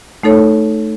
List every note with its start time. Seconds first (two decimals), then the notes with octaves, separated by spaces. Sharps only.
0.23 A3 D#4 A4 C#5